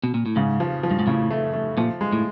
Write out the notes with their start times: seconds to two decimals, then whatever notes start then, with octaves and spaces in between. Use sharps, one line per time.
0.04 B2
0.14 A#2
0.26 A2
0.36 G#2 C#3
0.60 F3
0.83 F3
0.91 G2
0.99 G#2
1.07 A2 C#3
1.30 A3
1.53 A3
1.77 A#2 F3
2.01 G#3
2.13 A2